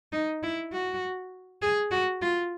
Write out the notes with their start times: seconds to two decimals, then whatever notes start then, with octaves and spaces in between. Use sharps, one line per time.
0.13 D#4
0.43 E4
0.73 F#4
1.62 G#4
1.91 F#4
2.22 F4